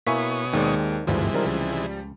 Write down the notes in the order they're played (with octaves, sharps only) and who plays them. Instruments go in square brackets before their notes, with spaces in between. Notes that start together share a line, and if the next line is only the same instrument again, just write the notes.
[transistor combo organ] B2 C#5 D#6 [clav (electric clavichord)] A#3 E4 [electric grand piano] G#5 C#6 B6
[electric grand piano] D#2 G#3 [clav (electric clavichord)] D#3 C4 D5
[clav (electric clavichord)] G#1 D2 G2 [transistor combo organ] C3 E3 G#3 [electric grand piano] F3 G3
[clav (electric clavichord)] D#3 C4 A#4 [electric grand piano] F3 G3
[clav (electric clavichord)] C#2